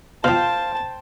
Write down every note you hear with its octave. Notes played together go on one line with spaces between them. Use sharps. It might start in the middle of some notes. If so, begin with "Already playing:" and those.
B2 F3 C5 F5 G5 A5